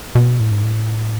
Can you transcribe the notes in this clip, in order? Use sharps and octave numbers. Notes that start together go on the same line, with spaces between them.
B2
A2
G#2
A2